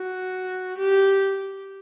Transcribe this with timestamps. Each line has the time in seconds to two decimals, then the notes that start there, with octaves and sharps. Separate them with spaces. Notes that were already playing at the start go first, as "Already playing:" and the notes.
Already playing: F#4
0.78 G4